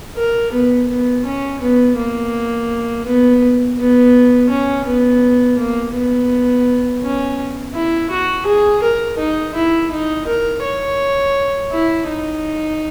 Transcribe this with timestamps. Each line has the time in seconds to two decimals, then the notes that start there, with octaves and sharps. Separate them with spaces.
0.16 A#4
0.52 B3
0.89 B3
1.25 C#4
1.62 B3
1.97 A#3
3.06 B3
3.77 B3
4.50 C#4
4.85 B3
5.59 A#3
5.95 B3
7.02 C#4
7.75 E4
8.10 F#4
8.46 G#4
8.83 A#4
9.19 D#4
9.55 E4
9.92 D#4
10.27 A#4
10.64 C#5
11.71 E4
12.08 D#4